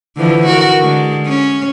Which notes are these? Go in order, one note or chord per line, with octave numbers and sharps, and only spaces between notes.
D3 E3 F3
F#4 A#4
D3 G#3
C#4